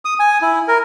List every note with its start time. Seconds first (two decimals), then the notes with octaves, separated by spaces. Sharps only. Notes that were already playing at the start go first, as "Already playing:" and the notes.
0.05 D#6
0.20 G#5
0.42 E4
0.68 A#4